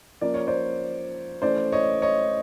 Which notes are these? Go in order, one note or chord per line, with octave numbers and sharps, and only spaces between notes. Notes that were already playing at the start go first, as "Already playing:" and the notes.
F3 A#3 C#4 D5
C#5
C5 D5
E3 A3 C#4 C5 D5
C#5 D#5
C#5 D#5